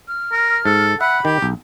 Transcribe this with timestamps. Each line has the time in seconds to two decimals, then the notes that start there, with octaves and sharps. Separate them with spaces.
0.08 F6
0.32 A#4
0.65 G#2 A4
1.01 E5 F#5 B5
1.25 D#3 G4
1.42 B1